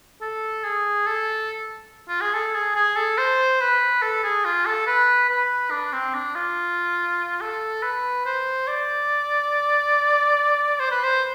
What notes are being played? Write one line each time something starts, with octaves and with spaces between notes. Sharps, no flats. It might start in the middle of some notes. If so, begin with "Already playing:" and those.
A4
G#4
A4
F4
G#4
A4
G#4
G#4
A4
C5
B4
A4
G#4
F4
A4
B4
B4
D4
C4
D4
F4
A4
B4
C5
D5
C5
B4
C5